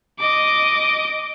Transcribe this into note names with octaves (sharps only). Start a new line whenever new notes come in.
D#5 D6